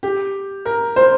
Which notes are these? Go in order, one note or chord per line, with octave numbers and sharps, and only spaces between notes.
G4
A#4
C5